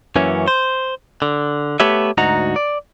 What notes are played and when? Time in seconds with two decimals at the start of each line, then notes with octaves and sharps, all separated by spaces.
0.16 F#2 E3 A#3 C#4 C#5
0.48 C5
1.22 D3
1.80 A3 B3 G4 B4 C#5 E5
2.18 D2 G#2 D#4 F#4 A#5
2.56 D5